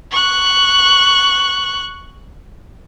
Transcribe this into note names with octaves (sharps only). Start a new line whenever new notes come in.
C#6 F#6